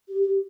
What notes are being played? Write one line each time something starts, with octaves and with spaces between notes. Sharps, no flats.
G4
G4